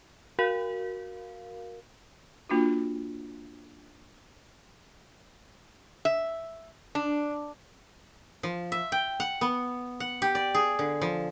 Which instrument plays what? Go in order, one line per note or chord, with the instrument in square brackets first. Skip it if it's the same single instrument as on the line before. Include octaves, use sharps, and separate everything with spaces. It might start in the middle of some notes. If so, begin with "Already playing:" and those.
[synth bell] F#4 A#4 F5
[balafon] A#3 D4 F4 F#4
[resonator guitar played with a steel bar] E5
D4
[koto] F3
E5
G5
F#5
B3
F#5
G4
D5
G#4
D3
F3